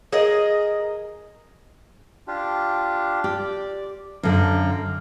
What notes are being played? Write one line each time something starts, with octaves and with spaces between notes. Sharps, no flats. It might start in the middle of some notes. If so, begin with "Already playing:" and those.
G#4 A#4 D#5
D4 F4 G4
G4 D5
F#2 D3 F5 A#5